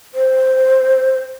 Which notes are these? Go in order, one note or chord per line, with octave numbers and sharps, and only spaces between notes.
C5